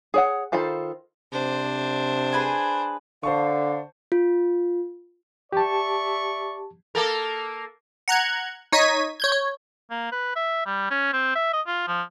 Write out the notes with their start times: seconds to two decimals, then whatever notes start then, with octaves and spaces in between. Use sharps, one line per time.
0.14 G#4 C#5 F#5
0.52 D#3 F4 A4 C5 B5
1.32 C3 D4 C5
2.32 G#4 B4 G#5
3.23 D3 C5 F5 A5 C#6
4.12 F4
5.52 G4 D5 E5 A5 C#6
6.95 A#3 A4 A#4
8.08 F#5 A#5 F#6 G#6
8.72 D#4 C#5 D#5 G#6 B6 D#7
9.20 C#5 G6 G#6
9.32 C#5
9.91 A#3
10.12 B4
10.36 E5
10.66 G3
10.90 C#4
11.13 C4
11.35 E5
11.53 D#5
11.67 F4
11.88 F3